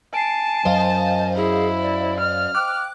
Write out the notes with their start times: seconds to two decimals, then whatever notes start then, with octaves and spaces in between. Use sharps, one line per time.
0.14 G#5 A5 C7 D7
0.65 F#2 F#3 C5 D#5 F5
1.36 E4 G#4
1.82 D5
2.20 F6
2.55 G5 D6 F#6